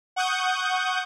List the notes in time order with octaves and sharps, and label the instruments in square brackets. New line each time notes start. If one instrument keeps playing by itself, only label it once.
[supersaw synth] F#5 C#6 D#6 G6